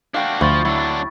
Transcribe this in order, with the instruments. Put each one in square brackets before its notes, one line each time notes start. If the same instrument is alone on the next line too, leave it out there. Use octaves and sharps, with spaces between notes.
[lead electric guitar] D4 F#4 [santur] F5 G5 D6
[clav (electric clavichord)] D2 [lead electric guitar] F3 [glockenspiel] B5 C#6 A6
[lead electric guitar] F#3 D4 [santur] E4